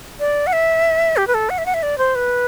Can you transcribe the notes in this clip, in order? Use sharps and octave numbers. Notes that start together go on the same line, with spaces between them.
D5
F#5
E5
G4
B4
A4
F#5
E5
F#5
E5
D5
C5
B4